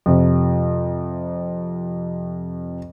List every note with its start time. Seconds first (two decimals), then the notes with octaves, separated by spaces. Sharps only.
0.06 F2 C3